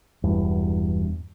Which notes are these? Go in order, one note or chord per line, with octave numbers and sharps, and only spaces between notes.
E1 E2 G2